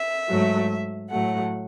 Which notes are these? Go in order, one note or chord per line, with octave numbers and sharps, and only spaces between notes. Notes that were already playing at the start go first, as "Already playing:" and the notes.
Already playing: E5
G#2 F#3 A3
A2 F#3 A3 F#5